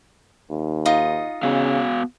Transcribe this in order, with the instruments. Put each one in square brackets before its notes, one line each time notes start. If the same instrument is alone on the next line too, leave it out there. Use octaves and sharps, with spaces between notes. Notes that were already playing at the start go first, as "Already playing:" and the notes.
[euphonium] D#2
[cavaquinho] D#4 F4 D#5
[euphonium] C#3 [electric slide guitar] B3 F#4 F5